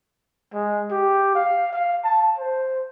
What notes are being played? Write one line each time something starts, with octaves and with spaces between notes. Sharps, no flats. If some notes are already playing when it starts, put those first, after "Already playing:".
G#3
G4
F5
F5
A5
C5